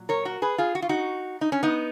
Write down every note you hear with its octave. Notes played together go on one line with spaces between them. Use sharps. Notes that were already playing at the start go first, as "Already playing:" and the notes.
Already playing: A#2 F#3
A#4 C#5
F#4 A#4
G#4 B4
F4 G#4
F#4
F4
D#4 F#4
D#4
C#4
B3 D#4